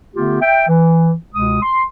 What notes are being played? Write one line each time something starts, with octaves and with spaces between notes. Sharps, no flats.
D3 A3 B3 F4 G4
E5 G5
E3
C#2 B2 G#3 D#6
C6